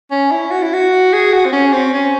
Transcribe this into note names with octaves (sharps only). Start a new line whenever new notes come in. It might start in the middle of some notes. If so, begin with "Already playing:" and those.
C#4
E4
F#4
E4
F#4
G#4
F#4
C4
C#4
C4
C#4